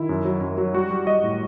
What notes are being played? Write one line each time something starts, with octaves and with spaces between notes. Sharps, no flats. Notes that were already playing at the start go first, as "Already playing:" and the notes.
Already playing: D#3 E4
F#2
F#3
F#2
F#3
G3 F#4
G3
G3 D#5
A2